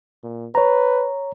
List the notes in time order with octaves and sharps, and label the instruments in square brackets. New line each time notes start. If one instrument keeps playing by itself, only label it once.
[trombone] A#2
[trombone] B4 [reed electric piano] C#5 A#5